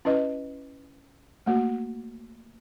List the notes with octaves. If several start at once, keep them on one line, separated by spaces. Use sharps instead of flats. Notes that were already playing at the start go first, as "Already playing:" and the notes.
C#4 E4 B4 D#5
A3 A#3 F#4